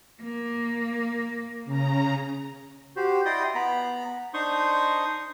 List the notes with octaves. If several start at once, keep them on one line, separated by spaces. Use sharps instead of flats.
A#3
C#3 A#5
F#4 G4 C5
E4 D5 D#5 G5 C6 D#6
B3 A#5 B5
D4 D#4 C5 C6 C#6 D#6